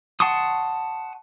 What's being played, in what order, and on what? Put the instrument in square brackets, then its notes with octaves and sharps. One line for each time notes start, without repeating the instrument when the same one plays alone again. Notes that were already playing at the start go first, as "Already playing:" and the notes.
[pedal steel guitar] F#5 A5 C6 C#6 D#6